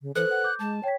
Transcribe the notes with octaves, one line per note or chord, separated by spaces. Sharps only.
C#3
E3 A4 B4 C5 F#6
F#5
D6 G6
G#3 A5
C#5 G5 B6